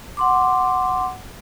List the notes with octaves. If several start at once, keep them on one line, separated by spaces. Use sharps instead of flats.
F#5 C6 D6